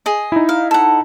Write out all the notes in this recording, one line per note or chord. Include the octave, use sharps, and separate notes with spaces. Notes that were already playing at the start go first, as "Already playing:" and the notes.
G#4 D#5
D#4 E4
F5
A4 F#5